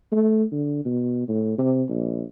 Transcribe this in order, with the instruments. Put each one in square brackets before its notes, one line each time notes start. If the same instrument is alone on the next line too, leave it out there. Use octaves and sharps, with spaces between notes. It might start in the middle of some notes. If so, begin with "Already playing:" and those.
[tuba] A3
D3
B2
A2
C3
A#1